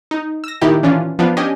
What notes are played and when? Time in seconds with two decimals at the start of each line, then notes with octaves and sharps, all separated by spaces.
0.11 D#4
0.44 E6 A#6
0.62 A#2 D#3 D#4 E4 G4
0.83 E3 C#4 D4 F4
1.19 F3 B3 D4 F4
1.37 C#4 D4 G4 D#5 G#5